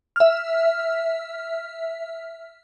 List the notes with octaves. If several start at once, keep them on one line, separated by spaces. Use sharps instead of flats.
E5 F6